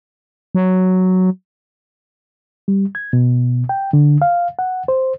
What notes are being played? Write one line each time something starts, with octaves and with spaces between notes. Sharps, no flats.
F#3
G3
G#6
B2
G5
D3
F5
F#5
C5